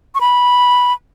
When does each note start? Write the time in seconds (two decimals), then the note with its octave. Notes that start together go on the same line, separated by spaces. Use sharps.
0.15 C#6
0.21 B5